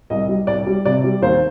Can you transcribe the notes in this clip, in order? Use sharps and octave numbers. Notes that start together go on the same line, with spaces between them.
C2 D#5
G3
C2 D5
G3
C3 D5
G3
D#2 C5